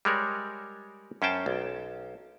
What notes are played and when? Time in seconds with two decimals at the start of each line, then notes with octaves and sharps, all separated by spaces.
0.05 G3 G#3 A#4 C#5
1.22 F#2 C#4 C5 G5 A5
1.46 B1